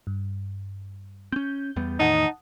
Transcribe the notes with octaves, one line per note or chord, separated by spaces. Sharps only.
G2
C4 C#4 G6
E2 G3 B3
E2 A2 D#3 D#4 F#5 A5 D#6